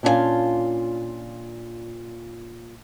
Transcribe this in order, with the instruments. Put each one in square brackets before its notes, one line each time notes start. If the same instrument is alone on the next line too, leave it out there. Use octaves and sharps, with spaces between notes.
[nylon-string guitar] A#2 C#4 D4 E4 F4 G#5